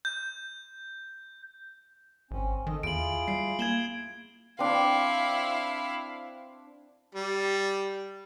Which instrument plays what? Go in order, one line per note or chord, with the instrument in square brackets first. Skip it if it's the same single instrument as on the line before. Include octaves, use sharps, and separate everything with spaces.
[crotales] G6
[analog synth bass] G#1 [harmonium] C4 C#4
[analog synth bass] D#3 [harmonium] A4 D#5
[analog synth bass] E2 [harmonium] E4 F4 G#4 [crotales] D7 F#7
[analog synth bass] G3 [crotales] C7
[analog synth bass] A#3 [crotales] G#6 E7 G7
[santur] C4 D4 [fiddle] E4 F5
[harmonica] G3